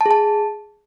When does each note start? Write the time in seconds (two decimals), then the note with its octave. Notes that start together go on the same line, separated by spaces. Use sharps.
0.01 A5
0.06 G#4
0.11 A5